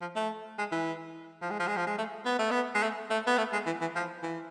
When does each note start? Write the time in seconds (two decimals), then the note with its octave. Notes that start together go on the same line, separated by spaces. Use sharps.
0.01 F3
0.16 A3
0.59 G#3
0.72 E3
1.42 F3
1.51 G#3
1.60 F3
1.67 G#3
1.77 F3
1.87 G#3
1.98 A3
2.25 B3
2.39 A3
2.51 B3
2.75 G#3
2.83 A3
3.10 A3
3.27 B3
3.38 A3
3.53 G#3
3.66 E3
3.81 E3
3.95 F3
4.23 E3